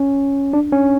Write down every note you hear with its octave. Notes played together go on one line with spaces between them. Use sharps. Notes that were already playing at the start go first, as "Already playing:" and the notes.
Already playing: C#4
D4
C#4